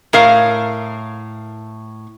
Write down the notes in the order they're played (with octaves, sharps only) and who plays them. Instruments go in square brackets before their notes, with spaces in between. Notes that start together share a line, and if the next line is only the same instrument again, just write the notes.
[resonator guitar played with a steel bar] A2 A#4 F5